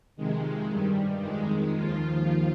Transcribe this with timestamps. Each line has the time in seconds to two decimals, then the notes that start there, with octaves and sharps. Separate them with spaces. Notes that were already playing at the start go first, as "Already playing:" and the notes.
0.16 F2 C3 D#3 G#3
0.70 G2 D#3 G3
1.22 F2 D#3 G#3
1.75 D#2 D#3 F3 F4